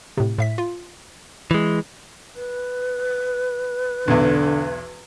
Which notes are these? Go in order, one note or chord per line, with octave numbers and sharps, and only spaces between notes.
A2 C3
A2 E5 B6
F4
E3 G#3
B4
B1 E2 D3